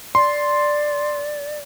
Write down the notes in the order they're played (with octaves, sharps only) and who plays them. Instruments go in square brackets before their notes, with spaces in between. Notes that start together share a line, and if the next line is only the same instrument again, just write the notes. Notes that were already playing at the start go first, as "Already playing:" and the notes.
[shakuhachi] D5 [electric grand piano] C6